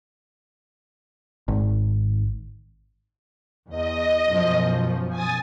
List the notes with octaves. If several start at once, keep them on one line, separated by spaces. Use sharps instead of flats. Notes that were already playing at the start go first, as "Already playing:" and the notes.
G#1
E2 D#5
F#2 B2 F3
G#5 D#6 A6